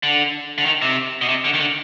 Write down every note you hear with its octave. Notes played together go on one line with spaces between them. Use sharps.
D3
D3
D#3
C3
B2
C3
D3
D#3
D3